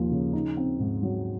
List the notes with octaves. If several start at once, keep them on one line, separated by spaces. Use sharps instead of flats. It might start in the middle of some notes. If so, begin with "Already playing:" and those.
Already playing: D#2 F3 A#3
C#3
D#4
C4
G#2
F#3